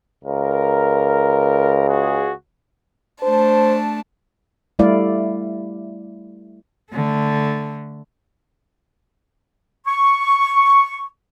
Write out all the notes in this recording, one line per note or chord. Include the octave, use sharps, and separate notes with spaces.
C#2 A#4
F#4 G#4
A3 D4 C5 A5
G3 A3 E4 D5 F5
D3 A3
C#6